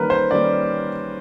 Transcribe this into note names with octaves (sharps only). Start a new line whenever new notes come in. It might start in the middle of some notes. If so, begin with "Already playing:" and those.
Already playing: D#3 G3 A#3 C#4 A#4 B4
C5
D#3 G3 A#3 C#4 D5